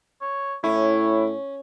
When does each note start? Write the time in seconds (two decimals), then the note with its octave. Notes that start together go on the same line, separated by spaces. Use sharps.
0.22 C#5
0.64 A2 C#4 E4 C#5